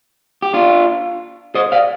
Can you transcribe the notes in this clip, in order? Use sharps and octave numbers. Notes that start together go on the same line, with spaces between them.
G4
D4 F4
C5 D#5
D5 F5